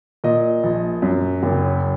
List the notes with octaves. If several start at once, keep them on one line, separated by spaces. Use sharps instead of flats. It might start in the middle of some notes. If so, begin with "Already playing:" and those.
A#2 D#5
A#1
F#2
F#1